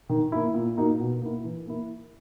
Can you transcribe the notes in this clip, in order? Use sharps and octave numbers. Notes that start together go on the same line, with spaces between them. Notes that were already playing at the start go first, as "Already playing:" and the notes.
D#3
A#3 E4
A#2
A#3 D#4 F#4
B2
A#3 E4
E3
A#3 E4